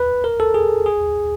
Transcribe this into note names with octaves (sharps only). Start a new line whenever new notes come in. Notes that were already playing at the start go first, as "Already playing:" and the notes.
Already playing: B4
A#4
A4
G#4
G#4